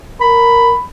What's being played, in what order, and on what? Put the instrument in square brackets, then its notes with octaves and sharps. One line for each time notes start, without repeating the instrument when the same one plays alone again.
[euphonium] A#4 [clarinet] B5